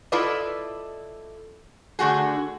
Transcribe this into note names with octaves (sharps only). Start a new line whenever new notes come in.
E4 F4 A4 B4 D5 D#5
D3 A3 F#4 G#4